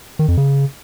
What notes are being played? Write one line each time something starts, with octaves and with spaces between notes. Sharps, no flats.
D#3
F2
C#3